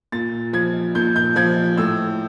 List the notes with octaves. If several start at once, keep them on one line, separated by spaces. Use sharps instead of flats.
A#2 A6
F3 G#6
A#2 G6
G6
F3 G#6
A2 E6